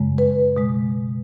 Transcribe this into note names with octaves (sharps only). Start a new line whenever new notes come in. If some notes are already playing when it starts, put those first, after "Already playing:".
Already playing: F#2 C#3 G#3
B4
B2 G#3